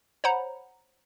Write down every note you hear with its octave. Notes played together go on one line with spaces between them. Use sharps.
C5 C#5 F#5 A#5 B5